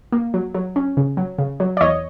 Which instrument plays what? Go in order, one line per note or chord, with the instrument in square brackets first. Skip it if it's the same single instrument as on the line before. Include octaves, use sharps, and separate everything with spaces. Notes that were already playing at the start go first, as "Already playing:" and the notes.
[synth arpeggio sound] A#3
F#3
F#3
C#4
C#3
F#3
C#3
F#3
D5
E2 C#5 D#5